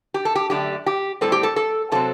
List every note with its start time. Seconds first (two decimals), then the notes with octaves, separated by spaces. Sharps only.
0.14 G4
0.25 A4
0.35 G4
0.50 F#2 D3 A3 D4 G4
0.86 G4
1.21 A2 G3 C4 A4
1.32 G4
1.43 A4
1.56 A4
1.92 C3 F#3 C4 A4